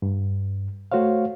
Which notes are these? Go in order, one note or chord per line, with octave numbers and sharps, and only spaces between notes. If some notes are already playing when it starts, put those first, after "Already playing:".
G2
A3 F#4 C5 C#5 F5